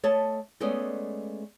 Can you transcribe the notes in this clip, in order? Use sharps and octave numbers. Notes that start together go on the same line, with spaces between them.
A3 C#5 D#5 A5
G#3 A3 B3 C#4 D5 D#5